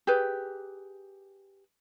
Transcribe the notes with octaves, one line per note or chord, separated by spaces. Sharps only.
G4 G#4 B4